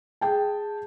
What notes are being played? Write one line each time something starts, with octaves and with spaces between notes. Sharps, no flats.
G#4 G5 A5